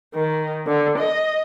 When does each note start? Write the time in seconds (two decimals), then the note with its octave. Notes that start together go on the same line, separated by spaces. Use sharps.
0.15 D#3
0.67 D3
0.99 D#5